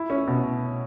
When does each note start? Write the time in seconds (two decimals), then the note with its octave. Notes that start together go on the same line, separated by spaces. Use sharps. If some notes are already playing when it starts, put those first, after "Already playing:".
Already playing: E4
0.10 C#4
0.27 B2